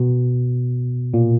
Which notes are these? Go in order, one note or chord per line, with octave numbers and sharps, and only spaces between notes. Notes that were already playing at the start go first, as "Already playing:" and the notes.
Already playing: B2
A#2